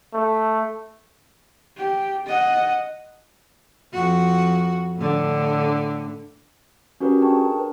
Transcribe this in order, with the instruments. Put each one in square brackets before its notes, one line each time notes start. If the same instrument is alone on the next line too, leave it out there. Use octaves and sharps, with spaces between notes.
[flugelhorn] A3
[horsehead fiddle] G4
D#5 F#5
[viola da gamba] F2 F#4
A2 D3
[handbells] C#4 F#4 G4 A#4 B4
D4 G#4 G5 A5 C#6
D4 A#4
B4